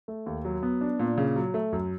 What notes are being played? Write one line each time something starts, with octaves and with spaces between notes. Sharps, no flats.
A3
D#2
F#3
B3
D4
A#2
C#3
F#3
A3
F#2